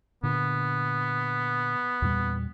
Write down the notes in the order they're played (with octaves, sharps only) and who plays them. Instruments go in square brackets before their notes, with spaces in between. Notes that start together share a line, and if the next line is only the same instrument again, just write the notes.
[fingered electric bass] A#2 D3 [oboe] B3
[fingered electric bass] E2 A#2 G3